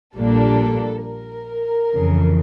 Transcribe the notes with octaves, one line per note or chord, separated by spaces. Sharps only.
A#1 A#2 G3 A#3 D4 A4
A#4
F2 C#3 E3